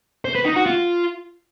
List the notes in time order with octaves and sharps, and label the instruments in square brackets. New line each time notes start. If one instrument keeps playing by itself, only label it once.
[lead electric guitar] C5
B4
D#4
F#4
F4